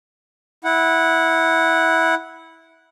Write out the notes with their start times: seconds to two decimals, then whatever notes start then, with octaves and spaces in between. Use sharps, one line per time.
0.64 E4 F#5